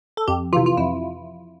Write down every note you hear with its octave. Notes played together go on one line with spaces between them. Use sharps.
A4
F2 G4
C3 E3 F4
F4
F2 E4